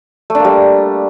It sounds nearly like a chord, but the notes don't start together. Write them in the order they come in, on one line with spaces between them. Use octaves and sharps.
A3 D4 A#3 G3